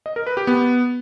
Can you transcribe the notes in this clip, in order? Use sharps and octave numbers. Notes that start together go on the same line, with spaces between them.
D#5
A#4
B4
G4
B3